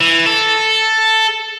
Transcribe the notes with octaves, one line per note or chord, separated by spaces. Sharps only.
E3
A4